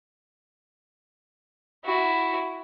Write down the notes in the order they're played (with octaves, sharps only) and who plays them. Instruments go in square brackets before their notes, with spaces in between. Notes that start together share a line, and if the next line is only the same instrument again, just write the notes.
[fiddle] E4 F#4